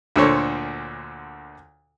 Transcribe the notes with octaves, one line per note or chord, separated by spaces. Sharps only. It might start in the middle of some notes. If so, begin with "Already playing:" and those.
D2 A#2 D3 A4 C5 C#5